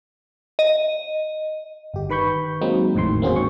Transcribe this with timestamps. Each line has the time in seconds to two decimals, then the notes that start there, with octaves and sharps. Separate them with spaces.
0.59 D#5
1.94 G1 G4
2.10 D#3 B4 B5 C#6 G6
2.61 F#3 G#3 A#3 C4 D#4
2.94 G#1 E2 A2 D#3 C6
3.22 A#3 C4 C#4 F#4 G#4 C5
3.36 G#2 C#6